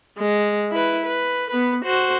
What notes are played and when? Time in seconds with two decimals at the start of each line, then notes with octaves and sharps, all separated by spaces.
0.18 G#3
0.71 E4 B4
1.05 B4
1.51 B3 B4
1.85 F#4 C5